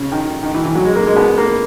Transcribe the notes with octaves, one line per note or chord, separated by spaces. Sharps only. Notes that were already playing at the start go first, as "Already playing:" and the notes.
Already playing: C#3
D#3
D#3
E3
E3
F#3
G#3
A#3
G#3
B3
A#3